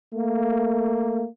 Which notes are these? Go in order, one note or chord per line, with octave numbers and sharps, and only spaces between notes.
A3 A#3